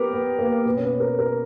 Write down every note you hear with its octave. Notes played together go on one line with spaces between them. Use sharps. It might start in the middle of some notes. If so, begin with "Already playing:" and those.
Already playing: B3 G4 A#4
B3
A#3
B2 B3
C#4
B3
A#4
A#4